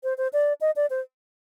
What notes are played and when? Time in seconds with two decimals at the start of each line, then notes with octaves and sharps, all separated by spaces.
0.04 C5
0.18 C5
0.33 D5
0.61 D#5
0.76 D5
0.90 C5